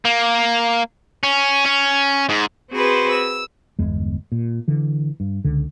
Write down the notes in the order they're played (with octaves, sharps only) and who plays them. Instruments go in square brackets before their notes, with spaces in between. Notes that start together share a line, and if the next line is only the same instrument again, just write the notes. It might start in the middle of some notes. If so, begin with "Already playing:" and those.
[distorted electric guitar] A#3
C#4
C#4
G#2
[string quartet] C4 F#4 G#4 B4 C5
E6
[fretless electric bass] G1 E2 G#3
A#2
D3 E3
G2
C#2 D3